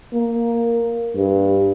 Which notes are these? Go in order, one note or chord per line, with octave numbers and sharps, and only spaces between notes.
A#3
G2